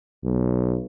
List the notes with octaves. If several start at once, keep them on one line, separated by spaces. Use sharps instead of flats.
B1